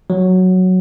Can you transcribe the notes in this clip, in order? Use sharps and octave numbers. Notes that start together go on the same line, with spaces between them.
F#3